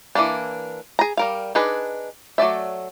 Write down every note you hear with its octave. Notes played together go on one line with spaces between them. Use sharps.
E3 G3 A#3 D4
G#4 A#5
G3 A#4 F5
D4 D#4 G#4 B4
F#3 A3 D5 E5